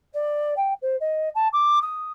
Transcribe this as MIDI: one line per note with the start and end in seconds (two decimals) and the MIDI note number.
0.13 0.53 74
0.56 0.73 79
0.82 0.96 72
1.00 1.29 75
1.35 1.47 81
1.53 1.79 86
1.81 2.12 87